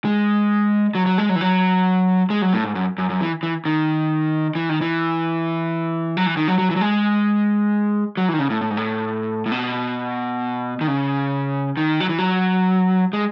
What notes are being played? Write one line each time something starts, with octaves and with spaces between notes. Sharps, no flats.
G#3
F#3
F#3
G#3
F#3
E3
F#3
G#3
F#3
A2
G#2
F#2
F#2
F#2
E3
E3
D#3
E3
D#3
E3
F#3
E3
D#3
F#3
F#3
E3
F#3
G#3
F#3
E3
D#3
C#3
A2
A2
G#2
A2
A2
B2
D#3
C#3
D#3
F#3
E3
F#3
G#3